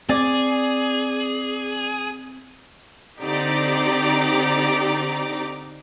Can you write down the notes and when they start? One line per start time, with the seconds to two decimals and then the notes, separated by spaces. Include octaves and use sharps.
0.09 C4 G#4 D5 G#5
3.21 D3 C4 D#4 G4 D5 A#5